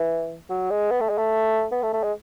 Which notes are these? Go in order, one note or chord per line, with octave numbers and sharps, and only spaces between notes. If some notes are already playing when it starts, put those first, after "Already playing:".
Already playing: E3
F#3
G#3
B3
A3
G#3
A3
B3
A3
A3
G#3